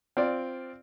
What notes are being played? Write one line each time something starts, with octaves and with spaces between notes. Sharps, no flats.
C4 F4 D5